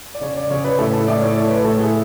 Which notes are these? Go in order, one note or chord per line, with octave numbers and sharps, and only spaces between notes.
D5
C#3 C#5
D5
C#3 C#5
B4
A2 A4
A4
A2 D5
C#5
A3 C#5
B4
A2 A4
G#4